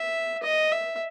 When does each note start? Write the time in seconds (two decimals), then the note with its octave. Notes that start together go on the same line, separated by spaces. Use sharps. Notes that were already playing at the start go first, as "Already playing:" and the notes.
Already playing: E5
0.43 D#5
0.72 E5